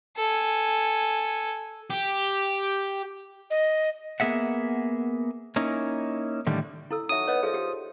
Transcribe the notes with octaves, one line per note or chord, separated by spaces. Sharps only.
A4 G#5
G4
D#5
A#3 B3 G#4 E5 F#5
A#3 C#4 D#4 E4
A2 D3 D#3 G3
E4 A4 E6
F#3 D#4 E5 D#6
B3 C#5 D#5
F3 G#4 A4 E5
G4